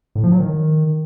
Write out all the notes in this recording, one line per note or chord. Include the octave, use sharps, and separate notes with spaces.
A2
F3
F#3
D#3